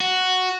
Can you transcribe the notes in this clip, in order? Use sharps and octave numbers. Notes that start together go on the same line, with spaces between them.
F#4